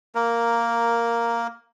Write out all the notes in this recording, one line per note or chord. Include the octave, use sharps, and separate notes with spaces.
A#3 A#4